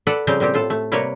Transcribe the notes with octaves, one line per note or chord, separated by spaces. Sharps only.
A4 B4 D5 F#5
C#3 F3 G3 C4 G4 G5
A#2 G3 C4 G4
A2 F4 A4
A3
C3 G3 A#3 A#4 B4 C#5